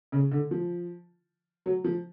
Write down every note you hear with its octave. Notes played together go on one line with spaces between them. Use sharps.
C#3
D3
F3
F#3
F3